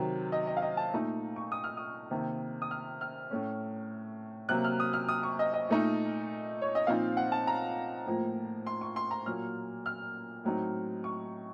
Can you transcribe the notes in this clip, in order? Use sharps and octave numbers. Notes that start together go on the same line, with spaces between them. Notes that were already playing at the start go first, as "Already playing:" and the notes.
Already playing: C3 D#3 F#3
D#5
D#5
F5
D#5
A5
A#2 A3 D#4
C#6
D#6
F6
D#6
C3 D#3 A#3
D#6
F6
F6
A2 A3 C#4
C3 F#3 A#3 F#6
F6
D#6
F6
D#6
C#6
D#5
D#5
A#2 A3 D#4
C#5
D#5
A#2 F3 C4 D#4 F5
F#5
A5
A#5
A2 F3 A#3
C6
C#6
C6
A#5
A#2 F#3 A#3 F6
F6
A2 F#3 C4 D#4
C#6